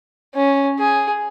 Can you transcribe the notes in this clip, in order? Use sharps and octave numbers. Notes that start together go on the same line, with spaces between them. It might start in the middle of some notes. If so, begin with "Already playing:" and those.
C#4
G#4